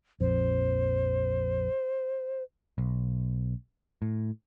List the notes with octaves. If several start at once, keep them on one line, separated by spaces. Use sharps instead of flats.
A#1 F2 C5
B1
A2